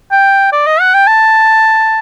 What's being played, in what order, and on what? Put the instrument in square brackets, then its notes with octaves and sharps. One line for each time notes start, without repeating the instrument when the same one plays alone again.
[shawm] G5
D5
D#5
F#5
G5
A5